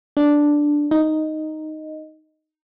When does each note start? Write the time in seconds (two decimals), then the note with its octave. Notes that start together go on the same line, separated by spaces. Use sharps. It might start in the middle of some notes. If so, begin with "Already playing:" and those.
0.17 D4
0.91 D#4